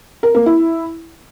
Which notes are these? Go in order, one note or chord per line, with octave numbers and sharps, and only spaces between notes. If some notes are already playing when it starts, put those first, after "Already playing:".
A#4
A#3
E4